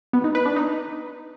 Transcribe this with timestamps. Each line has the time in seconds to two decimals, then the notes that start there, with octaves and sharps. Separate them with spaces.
0.13 B3
0.24 D#4
0.35 B4
0.46 D4
0.56 D#4